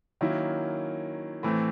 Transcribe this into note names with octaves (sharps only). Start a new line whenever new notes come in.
D#3 F#3 A#3 C#4 E4
A2 E3 A3 C4